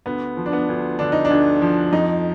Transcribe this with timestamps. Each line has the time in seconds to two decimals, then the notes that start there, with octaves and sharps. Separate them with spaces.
0.06 D2 B3
0.37 F3
0.46 D4
0.53 B3
0.69 D2
0.99 D3 D4
1.12 D#4
1.25 D4
1.30 D2
1.62 F3
1.92 F2 D#4